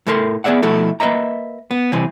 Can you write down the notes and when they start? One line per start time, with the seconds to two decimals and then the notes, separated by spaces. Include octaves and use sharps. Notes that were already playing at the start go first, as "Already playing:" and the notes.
0.07 A2 A3 A4 A#4 A5 C6
0.44 B3 G#4 D5 E5 F#5
0.62 B2 F3 A3 E4 F#4 A4
1.00 A#3 B4 D#5 E5 A#5
1.71 B3
1.93 C2 C3 E3 C4 G#5